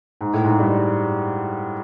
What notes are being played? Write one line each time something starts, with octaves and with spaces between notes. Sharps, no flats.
G#2
A2
G#2
G2